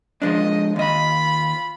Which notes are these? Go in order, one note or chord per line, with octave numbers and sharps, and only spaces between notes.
F3 G#3 D4 D#5
D#2 F4 D#5 B5